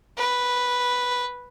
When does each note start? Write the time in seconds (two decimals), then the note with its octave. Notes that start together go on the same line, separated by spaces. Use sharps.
0.17 B4